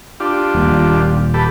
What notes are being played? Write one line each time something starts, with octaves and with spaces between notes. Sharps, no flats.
D4 F4 G4
D#1 A#2
G4 A4 B4